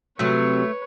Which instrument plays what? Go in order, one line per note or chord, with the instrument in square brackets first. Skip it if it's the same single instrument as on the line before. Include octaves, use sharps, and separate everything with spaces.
[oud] C3 F#3 C4 [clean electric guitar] A3 [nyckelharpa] B4 C#5